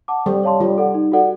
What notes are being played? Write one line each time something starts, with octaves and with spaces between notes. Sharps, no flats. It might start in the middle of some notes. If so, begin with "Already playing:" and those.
F#5 A5 D6
G3 A4
C#5 F5 A5 C6
G3 F4
A4 D5 F#5
D#4
F#4 A4 D5 F#5